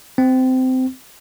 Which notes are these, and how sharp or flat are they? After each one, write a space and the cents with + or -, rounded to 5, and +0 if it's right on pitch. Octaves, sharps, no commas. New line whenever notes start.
C4 -20